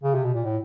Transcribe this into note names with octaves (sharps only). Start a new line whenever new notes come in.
C#3
C3
B2
A#2
A2